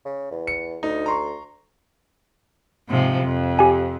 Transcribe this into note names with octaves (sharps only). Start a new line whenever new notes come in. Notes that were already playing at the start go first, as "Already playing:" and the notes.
C#3
E2
C#7
D2 D#4
A#5 C6 C#6
G#2 C3 F3
F2
G4 G#5